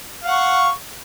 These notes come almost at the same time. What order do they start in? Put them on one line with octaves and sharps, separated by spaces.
F5 F#5 C#6